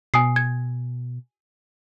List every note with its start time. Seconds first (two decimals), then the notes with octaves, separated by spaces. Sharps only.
0.14 B2 G#5 D#6 C7
0.36 G#6